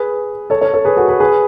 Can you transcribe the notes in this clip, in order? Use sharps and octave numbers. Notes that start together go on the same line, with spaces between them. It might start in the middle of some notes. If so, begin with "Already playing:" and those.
Already playing: G#4 B4
A4 C#5
A4 C#5
A4 C#5
G#4 B4
F#4 A4
G#4 B4
G#4 B4